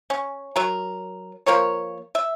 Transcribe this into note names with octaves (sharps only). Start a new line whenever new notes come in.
C#4
F#3 A#4
F3 A#3 A#4 C#5
E5